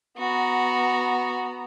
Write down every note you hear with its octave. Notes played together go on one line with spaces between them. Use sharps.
B3 F#4 A#5